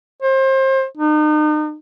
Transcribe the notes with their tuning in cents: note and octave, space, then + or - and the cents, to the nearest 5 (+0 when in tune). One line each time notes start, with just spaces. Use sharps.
C5 +30
D#4 -40